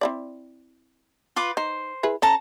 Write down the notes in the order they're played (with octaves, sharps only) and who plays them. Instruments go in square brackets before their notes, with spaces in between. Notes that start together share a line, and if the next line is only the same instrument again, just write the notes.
[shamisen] C4 E4 D5
[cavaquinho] F4 B4 D6
[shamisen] D#4 [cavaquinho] C5
[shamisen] E4 G#4 B4
[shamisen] C#4 [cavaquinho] A4 A5 A#5